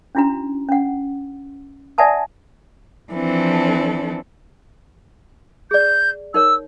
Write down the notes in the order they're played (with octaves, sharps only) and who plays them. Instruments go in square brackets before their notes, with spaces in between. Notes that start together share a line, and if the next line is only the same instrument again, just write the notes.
[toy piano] C#4 D4 E4 F#4 A#5
C#4 F#5
D5 E5 F#5 G#5 A5 D#6
[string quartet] E3 F3 C4 D4 A4
[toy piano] G#4 D5 [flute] G6
[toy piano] D#4 A#4 C#5 [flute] E6